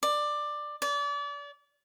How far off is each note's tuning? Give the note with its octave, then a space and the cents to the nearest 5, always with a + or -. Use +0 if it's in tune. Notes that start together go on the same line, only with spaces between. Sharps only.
D5 +15
D5 -35